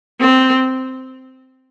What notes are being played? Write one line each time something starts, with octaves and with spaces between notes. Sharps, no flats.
C4